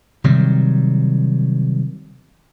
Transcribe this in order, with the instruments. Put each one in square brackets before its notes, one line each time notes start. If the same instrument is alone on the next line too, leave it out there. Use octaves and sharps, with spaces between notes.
[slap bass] C3 D#3 F#3 G3